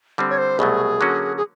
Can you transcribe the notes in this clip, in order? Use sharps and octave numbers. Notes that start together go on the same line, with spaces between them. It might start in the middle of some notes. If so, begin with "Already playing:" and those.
D3 G3 C4
C#5
C5
C2 B2 F#3 A3 G#4
D3 F#3 A#3 C#4 F#4
G#4